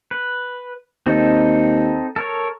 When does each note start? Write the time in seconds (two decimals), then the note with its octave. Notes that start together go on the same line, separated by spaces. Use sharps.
0.11 B4
1.06 D#2 C4 D#4 A4
2.16 A4 A#4 C#5